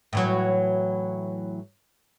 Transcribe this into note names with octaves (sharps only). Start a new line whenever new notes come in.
A2 E3 F#3